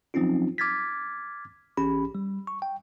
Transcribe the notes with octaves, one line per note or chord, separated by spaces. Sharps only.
F3 F#3 C4 C#4 D#4 F4
D6 F6 G#6 A6 B6
A#1 E3 C#4 G4 B5
G3
C#6
G5